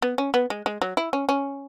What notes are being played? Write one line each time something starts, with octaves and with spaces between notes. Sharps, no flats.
B3
C#4
B3
G#3
G#3
F#3
E4
C#4
C#4